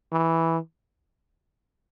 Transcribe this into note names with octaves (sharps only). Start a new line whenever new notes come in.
E3